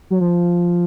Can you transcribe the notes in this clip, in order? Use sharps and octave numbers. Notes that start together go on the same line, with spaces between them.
F#3
F3